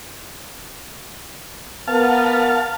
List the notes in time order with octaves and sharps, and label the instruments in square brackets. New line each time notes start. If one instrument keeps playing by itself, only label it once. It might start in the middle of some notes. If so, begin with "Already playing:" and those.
[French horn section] B3 A#4 [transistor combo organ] F5 A5